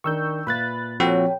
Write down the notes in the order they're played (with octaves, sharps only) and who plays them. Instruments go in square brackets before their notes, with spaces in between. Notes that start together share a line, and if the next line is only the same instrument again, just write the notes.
[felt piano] D#3 D4 A#4 [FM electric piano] C#6 E6 G6
[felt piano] A#2 [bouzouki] F4 B4 E5 [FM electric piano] B5 F#6 A6
[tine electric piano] F3 C4 F#4 [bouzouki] F#3 C#4 B4 [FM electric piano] A4 G5